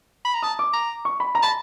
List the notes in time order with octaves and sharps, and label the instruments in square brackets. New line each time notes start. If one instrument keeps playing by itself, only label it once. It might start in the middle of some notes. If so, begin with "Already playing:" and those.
[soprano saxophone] B5
A#5
[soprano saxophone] A5 [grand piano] D#6
[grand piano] D6
[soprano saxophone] A#5
[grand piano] C#6
B5
A#5
[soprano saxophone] A5 [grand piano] B5